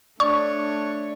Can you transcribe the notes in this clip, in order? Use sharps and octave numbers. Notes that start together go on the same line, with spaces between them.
A3 D4 C#5 D5 C#6